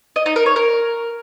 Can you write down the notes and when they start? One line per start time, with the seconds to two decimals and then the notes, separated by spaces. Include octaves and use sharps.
0.16 D#5
0.26 D#4
0.36 A#4
0.46 C#5
0.56 A#4